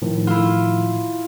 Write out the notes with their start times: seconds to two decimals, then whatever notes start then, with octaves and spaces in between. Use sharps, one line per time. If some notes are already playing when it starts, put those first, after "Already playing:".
0.02 A2 D#3 F3
0.27 E4 F4